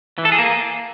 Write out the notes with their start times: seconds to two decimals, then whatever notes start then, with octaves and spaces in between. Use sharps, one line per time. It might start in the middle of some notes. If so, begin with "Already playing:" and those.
0.18 E3
0.25 A4
0.32 G#4
0.39 A#3